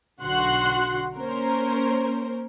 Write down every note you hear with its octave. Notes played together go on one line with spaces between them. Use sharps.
B1 D3 F#4 F#5 C6 F#6
A#3 C#4 A#4 C5